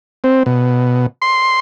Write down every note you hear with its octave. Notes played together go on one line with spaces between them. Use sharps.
C4
B2
C6